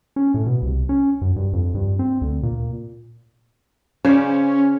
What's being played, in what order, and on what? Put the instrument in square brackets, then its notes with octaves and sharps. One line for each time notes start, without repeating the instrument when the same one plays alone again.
[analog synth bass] C#4
A2
B2
C2
C#4
F#2
G2
F2
G2
C4
D2
A#2
[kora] C#3 C5 D5 [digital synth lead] C#4